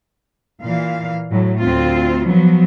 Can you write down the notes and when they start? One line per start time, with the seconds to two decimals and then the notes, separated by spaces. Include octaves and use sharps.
0.63 A#2 E3 F5
1.31 A2 F#3
1.61 D2 C4 F4
2.26 F3 F#3 B3